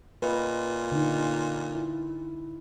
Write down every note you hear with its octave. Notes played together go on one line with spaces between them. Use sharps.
A#2 B4 D#5
D3 D#4
E4